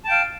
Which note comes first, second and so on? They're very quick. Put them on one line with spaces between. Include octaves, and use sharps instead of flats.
A5 G5 F5